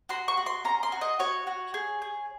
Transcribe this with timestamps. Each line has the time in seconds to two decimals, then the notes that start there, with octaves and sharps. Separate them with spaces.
0.09 F#4 C6
0.28 C#6
0.37 F#4
0.46 C6
0.65 C#4 A#5
0.83 C6
0.92 F#4
1.01 D#5
1.19 F#4 C#5
1.47 F#4
1.74 G#4
2.02 G#4